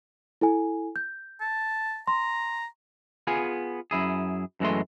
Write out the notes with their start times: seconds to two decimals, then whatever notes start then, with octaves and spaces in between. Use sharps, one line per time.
0.41 E4 A4 G#5
0.96 G6
1.41 A5
2.07 A#5 C6
3.27 B3 F4 G#4 G#5
3.91 F#2 E4 G#4
4.60 F#2 E3 G#3 A3 C6